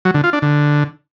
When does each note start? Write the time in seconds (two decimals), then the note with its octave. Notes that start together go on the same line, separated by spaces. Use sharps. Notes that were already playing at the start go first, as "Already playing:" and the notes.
0.05 F#3
0.14 D3
0.24 F4
0.33 D4
0.42 D3